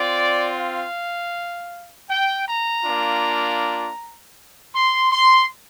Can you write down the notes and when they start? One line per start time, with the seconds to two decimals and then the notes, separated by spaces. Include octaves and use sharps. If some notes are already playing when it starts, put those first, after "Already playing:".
Already playing: C4 F4 D5
0.57 F5
2.09 G5
2.47 A#5
2.84 A#3 D4 F4
4.75 C6
5.11 C6